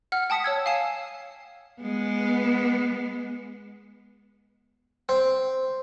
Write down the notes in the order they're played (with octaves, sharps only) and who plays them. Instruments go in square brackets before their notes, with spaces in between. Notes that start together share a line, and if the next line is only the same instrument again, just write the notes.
[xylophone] F#5 F6
G5 A5 D#6 B6 C#7
C#5 E6 G#6
F5 G#5 C7 E7
[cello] G#3 B3
[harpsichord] C4